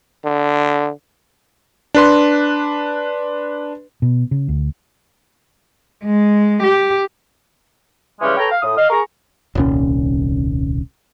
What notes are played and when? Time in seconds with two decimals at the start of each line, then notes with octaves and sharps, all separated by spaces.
0.25 D3
1.95 D4 B4 C6
4.02 B2
4.31 C#3
4.48 D2
6.05 G#3
6.63 G4
8.21 C#3 E3 G3 G#3 C#4
8.37 A4 B4 C#5 G5 A#5
8.51 F5
8.62 A2 D#6
8.77 D#5 F5
8.90 G#4 A#4 A#5 C#6
9.55 D#1 C2 C#4